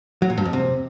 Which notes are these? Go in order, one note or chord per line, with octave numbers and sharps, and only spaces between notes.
F#3
A#2
G2
F2
C3